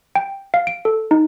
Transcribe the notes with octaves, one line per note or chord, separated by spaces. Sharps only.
G5
F5
D7
A4
D#4